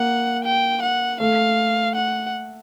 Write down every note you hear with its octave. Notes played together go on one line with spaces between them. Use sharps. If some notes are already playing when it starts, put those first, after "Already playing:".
Already playing: A#3 F#5
G5
F#5
A3 F5
F#5